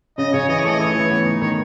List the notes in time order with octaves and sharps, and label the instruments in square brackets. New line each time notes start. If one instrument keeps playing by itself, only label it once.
[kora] C#3 [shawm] D#5
[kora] C#3 [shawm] C#5
[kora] E3 [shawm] D#5
[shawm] C#5
[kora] A3
[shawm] D#5
[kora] E3 [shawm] C#5
[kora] E3
B3
D#4
[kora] D#3 [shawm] C#5